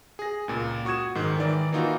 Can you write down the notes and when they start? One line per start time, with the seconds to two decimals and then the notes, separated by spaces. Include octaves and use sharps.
0.19 G#4 A#6
0.48 C#2 A#2
0.85 F#4 C#6 D#6 G#6 E7
1.15 G#2 D#3
1.37 D#3 E3 D5
1.72 E3 A#3 D#4 F4 F#4